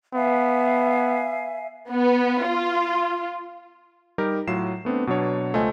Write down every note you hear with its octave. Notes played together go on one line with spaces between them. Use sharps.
B3 E5 F5 G#5
B3
F4
G3 D#4 G4 A#4
A2 F#3 F4 C7 E7
A3 B3 C4 D4
B2 F#3 D4 C#5
C#2 A3 F4 C5 D#5 G#5